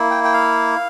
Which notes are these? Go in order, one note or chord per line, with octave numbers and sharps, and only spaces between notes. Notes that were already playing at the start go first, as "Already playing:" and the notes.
Already playing: A#3 E4
G5
G5
F5